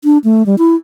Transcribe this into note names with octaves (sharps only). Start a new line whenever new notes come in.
D4
A3
G3
E4